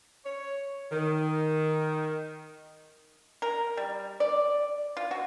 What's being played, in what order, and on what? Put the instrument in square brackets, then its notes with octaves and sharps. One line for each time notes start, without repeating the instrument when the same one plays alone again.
[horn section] C#5
D#3
[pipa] A#4
G3
D5
F4
F#4